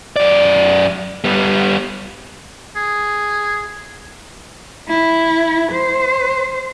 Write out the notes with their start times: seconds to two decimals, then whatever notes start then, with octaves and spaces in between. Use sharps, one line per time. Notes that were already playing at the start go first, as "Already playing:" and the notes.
0.16 F#2 D5
1.24 G3 B3
2.76 G#4
4.88 E4
5.72 C5